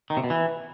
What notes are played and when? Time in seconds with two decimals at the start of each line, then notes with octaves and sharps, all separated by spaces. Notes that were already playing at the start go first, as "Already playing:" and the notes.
0.10 D#3
0.17 C3
0.24 B2
0.30 E3